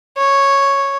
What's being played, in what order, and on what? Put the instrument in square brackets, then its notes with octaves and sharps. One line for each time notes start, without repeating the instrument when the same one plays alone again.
[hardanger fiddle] C#5